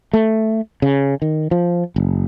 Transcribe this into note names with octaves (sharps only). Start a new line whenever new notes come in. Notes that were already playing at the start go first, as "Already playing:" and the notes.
A3
C#3
D#3
F3
F#1